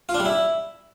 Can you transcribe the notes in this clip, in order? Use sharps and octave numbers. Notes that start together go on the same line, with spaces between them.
F4
D4
G3
E4